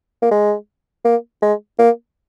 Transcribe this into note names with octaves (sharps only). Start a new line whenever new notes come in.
A#3
G#3
A#3
G#3
A#3